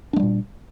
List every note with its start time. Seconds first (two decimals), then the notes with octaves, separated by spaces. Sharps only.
0.13 D4
0.16 G#3
0.20 G3
0.23 A#2